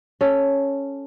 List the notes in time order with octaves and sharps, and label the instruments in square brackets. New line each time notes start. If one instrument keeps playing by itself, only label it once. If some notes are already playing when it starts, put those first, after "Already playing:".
[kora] C#4 A4